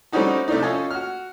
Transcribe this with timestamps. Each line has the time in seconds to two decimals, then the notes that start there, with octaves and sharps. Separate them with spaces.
0.12 G3 A3 C4 C#4 D#4 F#4
0.48 C3 A3 D4 D#4
0.62 C#4 F4 A4 D#5 G#5 A5
0.91 F#4 F6